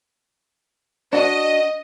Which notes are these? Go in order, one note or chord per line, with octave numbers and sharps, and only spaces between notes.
D4 F#4 D#5